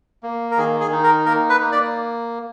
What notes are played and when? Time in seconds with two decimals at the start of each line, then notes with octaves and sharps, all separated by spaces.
0.23 A#3
0.51 A#4
0.57 D#3 G#4
0.80 G#4
0.92 D#4
1.03 A#4
1.26 A#3 A#4
1.49 B4
1.61 A#3
1.72 D5